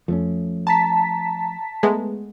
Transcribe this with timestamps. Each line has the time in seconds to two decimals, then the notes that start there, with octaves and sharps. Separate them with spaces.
0.08 F2 F3 A3 C#4
0.67 A5 A#5 B6
1.83 G#3 A3 B3